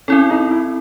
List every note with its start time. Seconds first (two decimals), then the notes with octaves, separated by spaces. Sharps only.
0.08 C4 C#4 E4 A4
0.30 D#4
0.51 E4